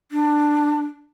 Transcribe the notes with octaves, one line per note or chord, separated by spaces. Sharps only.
D4